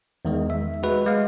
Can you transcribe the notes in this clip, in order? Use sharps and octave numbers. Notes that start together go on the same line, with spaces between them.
E2 D#3 G#3
E5
G#3 F#4 B4
G#3 F5